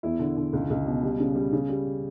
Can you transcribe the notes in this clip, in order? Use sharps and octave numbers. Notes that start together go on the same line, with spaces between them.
E2 E4
D3
D3
C#2
C#2
B2
G3
C#3
G3
C#3
G3